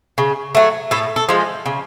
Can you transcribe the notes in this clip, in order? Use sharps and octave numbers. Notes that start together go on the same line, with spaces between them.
C#3
F#3 A3
A2 A4
A4
F3 G#3
C#3